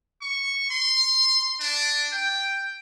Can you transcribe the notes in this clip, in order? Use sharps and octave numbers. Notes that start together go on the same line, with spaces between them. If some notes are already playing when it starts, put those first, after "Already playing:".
C#6
C6
D4
G5